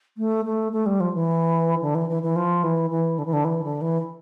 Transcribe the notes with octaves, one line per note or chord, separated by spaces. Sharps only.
A3
A3
A3
G3
F3
E3
D3
E3
E3
E3
F3
E3
E3
D3
E3
D3
E3
D3
E3